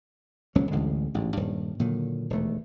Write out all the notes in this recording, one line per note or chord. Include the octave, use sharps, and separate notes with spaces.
D#1 C#2 F#3 C#4
A1 D2 D3 G#3
A1 G#2
D#1 G2
A#2 D3 D#3 F#3
E1 D#2 A3